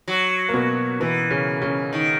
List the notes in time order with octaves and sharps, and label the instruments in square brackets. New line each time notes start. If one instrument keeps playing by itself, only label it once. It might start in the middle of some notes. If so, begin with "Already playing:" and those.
[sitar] F#3
[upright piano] A#3
B2 B3
[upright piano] B2 B3 [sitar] E3
[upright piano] C#3 C#4
C#3 C#4
[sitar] D#3